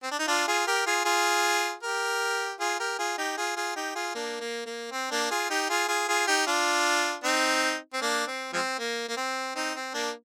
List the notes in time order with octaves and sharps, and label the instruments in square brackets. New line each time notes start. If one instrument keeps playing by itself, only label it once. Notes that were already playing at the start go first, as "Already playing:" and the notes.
[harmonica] C4
D4
D#4
D4 F4
F4 G#4
G4 A#4
F4 G#4
F4 G#4
G4 A#4
F4 G#4
G4 A#4
F4 G#4
D#4 G4
F4 G#4
F4 G#4
D#4 G4
F4 G#4
A#3 D4
A#3
A#3
C4
A#3 D4
F4 G#4
D#4 G4
F4 G#4
F4 G#4
F4 G#4
D#4 G4
D4 F4
C4 D#4
C4
A#3 D4
C4
F3 G#3 C4
A#3
A#3
C4
C4 D#4
C4
A#3 D4